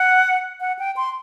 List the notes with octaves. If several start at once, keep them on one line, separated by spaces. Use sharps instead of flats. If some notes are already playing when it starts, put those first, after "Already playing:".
Already playing: F#5
F#5
G5
C6